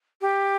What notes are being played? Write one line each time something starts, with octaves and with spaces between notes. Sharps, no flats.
G4